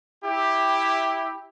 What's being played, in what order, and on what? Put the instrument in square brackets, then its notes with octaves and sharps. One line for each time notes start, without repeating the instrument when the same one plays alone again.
[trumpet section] E4 G4